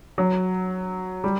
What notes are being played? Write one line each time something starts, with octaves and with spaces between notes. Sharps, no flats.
F#3
G3